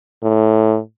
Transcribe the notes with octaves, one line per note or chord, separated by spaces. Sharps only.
A2